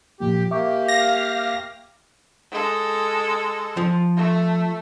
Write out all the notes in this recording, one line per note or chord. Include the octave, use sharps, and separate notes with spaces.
A#2 F3 A#3 G4
A#3 G4 E5 C#6 D6
F5 A#6
G#3 A4
F3
A3